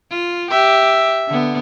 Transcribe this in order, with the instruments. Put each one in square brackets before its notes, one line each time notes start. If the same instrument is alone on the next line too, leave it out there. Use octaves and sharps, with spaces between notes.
[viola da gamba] F4
[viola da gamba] G4 [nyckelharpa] E5
[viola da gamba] D3 B3